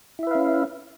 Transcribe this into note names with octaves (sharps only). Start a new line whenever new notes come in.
C#4 E4 B4 E5 F5